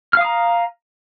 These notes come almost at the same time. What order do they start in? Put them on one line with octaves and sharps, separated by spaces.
F6 F5 D#6 A#5